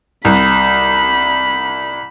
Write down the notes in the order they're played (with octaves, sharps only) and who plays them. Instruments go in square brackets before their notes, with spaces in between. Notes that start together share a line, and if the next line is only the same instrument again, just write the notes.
[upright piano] C2 [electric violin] B5